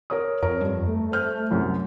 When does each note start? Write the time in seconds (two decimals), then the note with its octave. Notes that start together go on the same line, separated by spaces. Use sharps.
0.10 A#4 C#5 D#6
0.43 F2 A#4 C#5 A#5
0.61 G2
0.88 A3
1.12 C5 F6 G6
1.51 C2 F#2 F#3